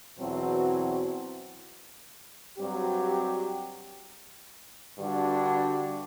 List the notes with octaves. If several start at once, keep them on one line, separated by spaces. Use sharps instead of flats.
E2 B2 F#3 C4 E4
G2 F#3 C4 G4
G2 D3 G3 D4 F#4